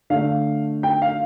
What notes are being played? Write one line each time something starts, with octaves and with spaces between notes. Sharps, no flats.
D3 A3 F5
G5
F5